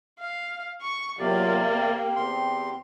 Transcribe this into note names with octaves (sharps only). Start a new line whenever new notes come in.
F5
C#6
E2 C3 F#3 A#3 F4 G4 D5
C4 G4
E2 C6